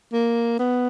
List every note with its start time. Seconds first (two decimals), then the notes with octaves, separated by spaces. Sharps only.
0.12 A#3
0.59 B3